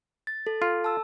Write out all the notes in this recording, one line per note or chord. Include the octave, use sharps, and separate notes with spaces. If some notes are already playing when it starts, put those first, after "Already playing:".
A6
A4
F4 A4
A5 E6